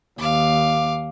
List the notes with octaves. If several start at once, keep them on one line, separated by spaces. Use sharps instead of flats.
D#2 F5 D6